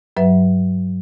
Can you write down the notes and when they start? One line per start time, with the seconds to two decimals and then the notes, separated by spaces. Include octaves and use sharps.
0.17 G2 F#3 B4 E5